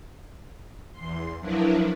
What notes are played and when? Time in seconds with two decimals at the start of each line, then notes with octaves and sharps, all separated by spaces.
0.93 E2 C6
1.40 F3 F#3 D4 E4 A#4 B4